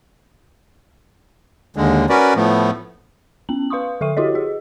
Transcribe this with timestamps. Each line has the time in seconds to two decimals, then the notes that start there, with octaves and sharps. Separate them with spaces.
1.76 D#2 D3 G#3
2.09 C#4 F#4 A#4 B4 D5
2.36 A2 F3 A3 B3
3.49 B3 C#4 F#7
3.70 B4 F5 C6 C#6 D#6
4.01 D3 A4 E5 C#6 D#7
4.17 E4 F#4 G4 A4 C#5 D#5
4.35 G#4 D#5